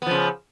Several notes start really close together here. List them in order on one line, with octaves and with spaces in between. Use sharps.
B3 F3 C#3